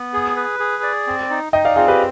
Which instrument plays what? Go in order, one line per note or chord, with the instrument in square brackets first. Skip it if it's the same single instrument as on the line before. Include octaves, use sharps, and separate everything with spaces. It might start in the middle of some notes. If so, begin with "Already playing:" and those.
Already playing: [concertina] B3
G#4
B4
G#4
D5
C4
D#4
[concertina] D#4 [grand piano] D#5 G5
[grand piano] D5 F5
[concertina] C4 [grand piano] F4 G#4
[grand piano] G4 B4